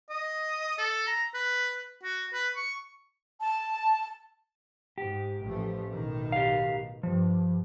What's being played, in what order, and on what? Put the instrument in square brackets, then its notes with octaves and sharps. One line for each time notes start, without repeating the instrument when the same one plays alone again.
[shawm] D#5
A4
A#5
B4
F#4
B4
C#6
[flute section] A5
[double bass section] G#2 [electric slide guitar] G4
[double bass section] A1 F3 A3
B1 A2 D#3
[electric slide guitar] G4 F5
[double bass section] G2 [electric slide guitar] F3